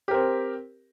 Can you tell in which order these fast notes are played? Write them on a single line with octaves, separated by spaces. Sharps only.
G4 A#4 C4